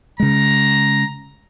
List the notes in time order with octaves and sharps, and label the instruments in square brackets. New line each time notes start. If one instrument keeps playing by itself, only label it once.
[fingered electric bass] C#3 G#3 [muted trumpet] A#5